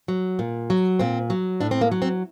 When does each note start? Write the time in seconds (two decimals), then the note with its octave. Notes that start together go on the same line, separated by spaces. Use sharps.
0.08 F#3
0.39 A#2
0.70 F#3
0.99 A#2 C4
1.30 F#3
1.60 A2 D4
1.71 C4
1.81 A#3
1.91 F#3
2.02 C4